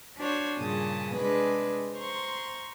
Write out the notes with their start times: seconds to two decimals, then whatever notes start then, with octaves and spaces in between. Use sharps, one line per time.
0.18 D4 F#4 C5 C#5
0.58 G2 A#2 C#3 G#4 A5 D#6
1.15 C3 G#3 D4 G#4 B4
1.94 C5 A#5 C6 C#6